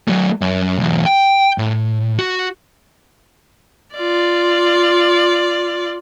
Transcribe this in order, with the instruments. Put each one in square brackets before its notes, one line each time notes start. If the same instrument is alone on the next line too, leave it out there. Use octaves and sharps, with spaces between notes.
[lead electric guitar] F#3 A3
F#2
B1 E2
G5
A2
F#4
[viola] F4 D5